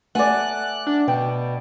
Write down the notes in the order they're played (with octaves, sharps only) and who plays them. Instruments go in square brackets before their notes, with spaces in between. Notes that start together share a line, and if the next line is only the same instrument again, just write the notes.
[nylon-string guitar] A3 G#5 [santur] D5 F#5 [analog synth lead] F#6
[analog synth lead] D4
[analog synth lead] B2 [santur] G5